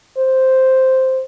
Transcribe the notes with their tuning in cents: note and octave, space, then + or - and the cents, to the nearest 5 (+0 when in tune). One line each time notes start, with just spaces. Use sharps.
C5 +0